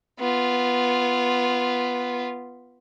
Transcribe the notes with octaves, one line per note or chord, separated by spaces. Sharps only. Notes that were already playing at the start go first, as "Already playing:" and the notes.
B3 F4